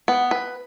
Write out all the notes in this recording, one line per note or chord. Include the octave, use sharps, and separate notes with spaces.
B3
B4